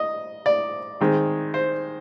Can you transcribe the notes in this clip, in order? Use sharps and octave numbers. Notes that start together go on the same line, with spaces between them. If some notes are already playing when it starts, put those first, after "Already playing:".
Already playing: D#5
D5
D#3 G#3 C4
C5